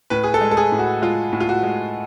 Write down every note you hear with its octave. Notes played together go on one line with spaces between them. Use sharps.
A2 B4
G#4
A4
G#3
A4
G#4
A2
F#4
G#3 F4
A2
F4
F#4
G#3